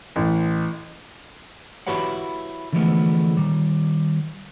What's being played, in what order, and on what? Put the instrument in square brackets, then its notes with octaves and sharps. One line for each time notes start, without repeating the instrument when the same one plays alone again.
[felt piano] A1
[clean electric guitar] E4 F#4 G4 B4 C#5 F#5
D3 E3 F3 G#3 A3 B3
D#3 G3